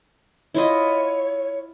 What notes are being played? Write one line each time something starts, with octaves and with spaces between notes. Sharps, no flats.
E4 F4 C#5 D#5